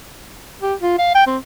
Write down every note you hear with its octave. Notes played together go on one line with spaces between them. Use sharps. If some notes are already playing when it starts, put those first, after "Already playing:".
G4
F4
F5
G5
C4